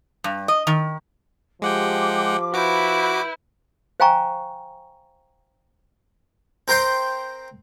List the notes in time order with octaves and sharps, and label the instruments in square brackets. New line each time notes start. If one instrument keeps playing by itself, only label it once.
[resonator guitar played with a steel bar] G2
D#5
D#3
[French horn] F3 [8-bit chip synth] G#3 F#5 G5 [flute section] G4 D6
[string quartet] E4 B4 [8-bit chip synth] F#4 D6 [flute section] G6
[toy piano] C5 F5 G5 G#5 A#5 C#6
[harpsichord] C4 A#4 C5 G5 C6